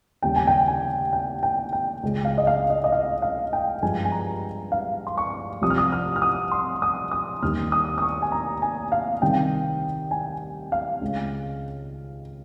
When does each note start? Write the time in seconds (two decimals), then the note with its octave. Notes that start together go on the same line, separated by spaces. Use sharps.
0.22 D#2 C#3 G3 G5
0.36 G#5
0.47 G5
0.68 G#5
1.13 G5
1.43 G5
1.73 G5
2.03 C#2 C#3 G#3
2.25 F5
2.38 D#5
2.47 F5
2.70 D#5
2.84 D#5
2.92 F5
3.22 F5
3.53 G5
3.82 G2 F3 G#3 G#5
4.05 G#5
4.12 A#5
4.72 F5
5.07 C6
5.18 C#6
5.62 C2 C3 F3 D#6
5.70 F6
5.78 D#6
5.92 F6
6.16 F6
6.22 D#6
6.52 C6
6.82 D#6
7.11 D#6
7.42 D#2 D#3 G3 F6
7.72 D#6
7.98 D#6
8.02 C#6
8.22 G#5
8.32 A#5
8.62 G#5
8.92 F5
9.22 C2 C3 D#3 G3 G5
10.11 G#5
10.72 F5
11.01 C#2 C#3 G#3